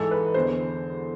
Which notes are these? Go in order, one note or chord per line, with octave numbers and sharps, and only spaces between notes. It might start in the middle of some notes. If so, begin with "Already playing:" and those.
Already playing: G#2 E3 A4
B4
E2 D3 C5